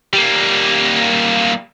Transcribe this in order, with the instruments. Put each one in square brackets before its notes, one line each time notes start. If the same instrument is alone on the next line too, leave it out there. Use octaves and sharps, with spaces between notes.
[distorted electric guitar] G3 A#3